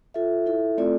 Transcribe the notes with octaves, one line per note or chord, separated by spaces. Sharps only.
F4 A4 E5
E4 A4 E5
A3 C4 F4 A4 D5